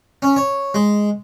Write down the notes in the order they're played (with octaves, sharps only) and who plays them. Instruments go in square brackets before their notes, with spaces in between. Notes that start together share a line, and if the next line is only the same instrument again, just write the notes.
[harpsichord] C#4
C#5
G#3